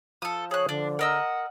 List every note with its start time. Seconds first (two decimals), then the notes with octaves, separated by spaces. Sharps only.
0.22 F3 A4 D#6
0.51 G#4 C#5 F#6
0.69 D3 D4
0.99 A#4 D#5 F#5 E6